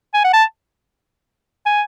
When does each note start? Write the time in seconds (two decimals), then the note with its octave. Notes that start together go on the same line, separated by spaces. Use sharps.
0.14 G#5
0.24 F#5
0.33 A5
1.66 G#5